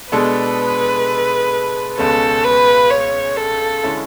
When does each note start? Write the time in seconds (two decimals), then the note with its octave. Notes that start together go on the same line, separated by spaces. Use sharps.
0.12 B2 G#3 D4 A4 B4
1.98 C#2 B2 G#3 C#4 A4
2.44 B4
2.91 C#5
3.36 A4
3.83 D3 G#3 C#4 E4